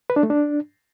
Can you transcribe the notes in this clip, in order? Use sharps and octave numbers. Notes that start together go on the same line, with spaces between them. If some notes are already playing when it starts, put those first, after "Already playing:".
B4
D4
A3
D4